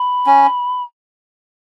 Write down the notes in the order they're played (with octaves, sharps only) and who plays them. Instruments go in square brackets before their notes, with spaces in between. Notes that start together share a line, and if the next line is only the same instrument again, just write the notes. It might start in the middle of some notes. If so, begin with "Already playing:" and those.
Already playing: [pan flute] B5
[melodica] C#4